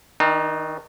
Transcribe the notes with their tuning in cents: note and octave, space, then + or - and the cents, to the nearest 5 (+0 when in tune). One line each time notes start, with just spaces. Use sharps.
D#3 +20 D#4 -45